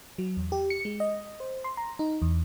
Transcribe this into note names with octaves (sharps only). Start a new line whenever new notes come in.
F#3
E2
G4
C#7
G#3
D#5
C5
C6
A#5
D#4
E2